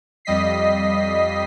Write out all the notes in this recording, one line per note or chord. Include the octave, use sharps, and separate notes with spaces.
F2 G3 D#5 B6 C7